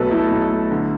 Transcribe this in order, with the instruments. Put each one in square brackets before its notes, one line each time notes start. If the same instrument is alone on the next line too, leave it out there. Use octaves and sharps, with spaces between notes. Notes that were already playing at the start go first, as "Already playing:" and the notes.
Already playing: [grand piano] B1 B2 A3 A4 B4
A3 E4
B1
A3
D3